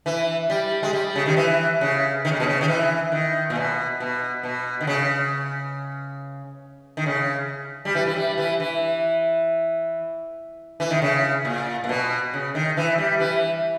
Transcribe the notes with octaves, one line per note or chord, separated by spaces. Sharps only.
E3
G3
G#3
G3
C#3
D#3
E3
C#3
D#3
C#3
B2
C#3
D#3
E3
D#3
A#2
B2
B2
B2
D#3
C#3
D#3
C#3
G3
E3
E3
G3
E3
E3
E3
D#3
C#3
A#2
A#2
B2
C#3
D#3
E3
G3
E3